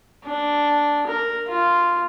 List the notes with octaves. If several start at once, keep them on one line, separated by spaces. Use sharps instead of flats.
D4
A#4
F4